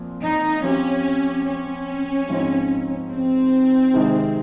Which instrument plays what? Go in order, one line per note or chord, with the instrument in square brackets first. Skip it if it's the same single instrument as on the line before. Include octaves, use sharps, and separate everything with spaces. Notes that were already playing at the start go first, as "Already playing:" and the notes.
Already playing: [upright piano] A#2 F3 C4
[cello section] D#4
[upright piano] F3 C4 G4 [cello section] C#4
[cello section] C#4
[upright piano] G#2 F3 C4 D#4
[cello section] C4
[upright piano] C3 D#3 G#3 D#4